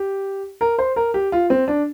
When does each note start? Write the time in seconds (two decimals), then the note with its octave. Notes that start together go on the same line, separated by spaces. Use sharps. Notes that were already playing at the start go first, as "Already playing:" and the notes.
Already playing: G4
0.61 A#4
0.79 C5
0.96 A#4
1.14 G4
1.32 F4
1.50 C4
1.68 D4